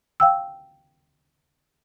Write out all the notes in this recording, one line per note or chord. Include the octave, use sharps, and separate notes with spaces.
F5 G5 E6